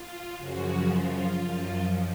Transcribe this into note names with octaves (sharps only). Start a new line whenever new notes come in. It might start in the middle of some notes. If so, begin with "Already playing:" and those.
Already playing: F4
F#2 C#3 F3 F#4
F4
F#2 F3